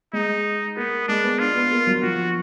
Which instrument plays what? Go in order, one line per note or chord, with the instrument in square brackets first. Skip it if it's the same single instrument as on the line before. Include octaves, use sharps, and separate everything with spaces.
[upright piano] G#3 [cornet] D#4
[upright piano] A#3 [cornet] B3
[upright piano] G#3 [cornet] D4
[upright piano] B3
[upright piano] D4 [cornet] F4
[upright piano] B3
A#3
F#3
[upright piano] F3 [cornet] F#4